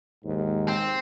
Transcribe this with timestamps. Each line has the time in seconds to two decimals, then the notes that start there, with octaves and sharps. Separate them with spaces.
0.25 D#2 G#2
0.68 C4